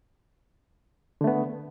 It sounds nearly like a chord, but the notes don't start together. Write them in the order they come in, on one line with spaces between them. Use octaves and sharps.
D3 A3 B3